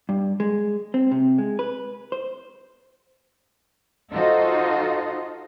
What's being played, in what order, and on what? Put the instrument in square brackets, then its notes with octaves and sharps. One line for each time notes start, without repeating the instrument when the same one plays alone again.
[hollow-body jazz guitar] G2
G#3
C4
C3
G#3
B4
C5
[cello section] D#4 F4 F#4 A4 C5 D#5